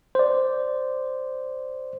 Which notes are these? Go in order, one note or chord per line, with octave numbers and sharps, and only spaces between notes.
C5 D5